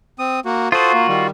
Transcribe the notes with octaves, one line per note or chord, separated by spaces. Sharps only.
C4 D#6
A#3 F#4
F4 F#4 A4 C5 D#6
A#3
D#3 G3